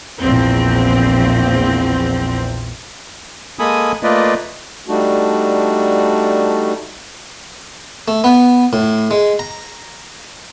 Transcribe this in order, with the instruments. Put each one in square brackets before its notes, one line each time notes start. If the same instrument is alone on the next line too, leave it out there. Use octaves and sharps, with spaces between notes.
[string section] A#1 E2 C4
[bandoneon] G#3 A#3 A4 G#5 B5 D#6
A3 A#3 F4 B4 D5 D#5
[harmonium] G3 A3 D4 D#4 F#4
[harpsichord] A3
B3
A2
G#3
A#5